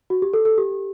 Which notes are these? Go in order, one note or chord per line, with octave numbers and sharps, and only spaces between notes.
F#4
G4
A4
A4
G4